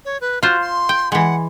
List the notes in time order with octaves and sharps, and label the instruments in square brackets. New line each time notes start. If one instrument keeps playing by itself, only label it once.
[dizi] C#5
B4
[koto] F4 C5 [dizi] F#4
[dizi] C6
[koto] G5
[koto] E3 G#3 [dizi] F#5